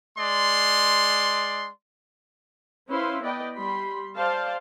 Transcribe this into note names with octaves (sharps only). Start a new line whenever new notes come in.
G#3 D5 C6
C#4 E4 B4 C5 F5 C6
B3 B4 D5 D#5 G5
G3 B5 C6
C5 D5 F5 A5